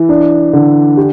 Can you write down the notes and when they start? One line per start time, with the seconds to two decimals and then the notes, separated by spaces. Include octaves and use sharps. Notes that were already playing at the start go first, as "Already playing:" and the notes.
Already playing: E3
0.09 D4
0.53 D3
0.97 G4